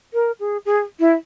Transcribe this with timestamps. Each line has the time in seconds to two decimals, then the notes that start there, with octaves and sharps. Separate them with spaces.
0.13 A#4
0.40 G#4
0.65 G#4
0.99 E4